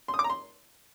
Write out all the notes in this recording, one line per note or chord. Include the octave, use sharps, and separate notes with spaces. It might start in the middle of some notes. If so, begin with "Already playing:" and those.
C6
D#6
D6
A#5
C6